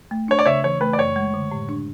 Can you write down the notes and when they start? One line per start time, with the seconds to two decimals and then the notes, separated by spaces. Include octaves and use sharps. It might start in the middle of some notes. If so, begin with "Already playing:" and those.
0.11 A3
0.28 D4 C#5
0.39 D5
0.46 C#3 C#5 E5
0.64 E3 C#5
0.81 A3 B4
0.93 D5
0.98 F#2 C#5
1.16 G#3
1.34 D3
1.51 A2
1.69 D4